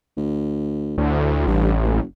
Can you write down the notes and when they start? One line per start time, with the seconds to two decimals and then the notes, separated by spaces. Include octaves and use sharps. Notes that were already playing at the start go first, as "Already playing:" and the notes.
0.17 D2
0.98 D2 A2
1.47 A1 G2
1.83 F#1